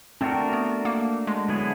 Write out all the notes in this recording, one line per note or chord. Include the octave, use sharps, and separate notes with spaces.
A3 C4 D4 F#4 A#4
B3
A#3
G#3
D3 F#3 B3 E4 G#4